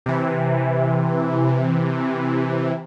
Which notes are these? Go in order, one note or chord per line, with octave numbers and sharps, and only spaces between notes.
C3 E3